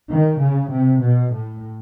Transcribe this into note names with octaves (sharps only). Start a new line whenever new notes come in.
D#3
C#3
C3
B2
A2